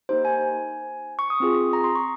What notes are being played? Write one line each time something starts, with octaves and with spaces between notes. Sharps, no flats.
A#3 D#4 G4 C5
G#5
C#6
D#6
C4 F4 G#4
A#5
C6
C#6